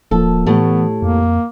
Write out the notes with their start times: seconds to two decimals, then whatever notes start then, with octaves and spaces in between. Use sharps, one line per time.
0.11 D1 F3 A#3 A4
0.46 A2 E3 A3 B3 G4
1.02 F2 A#3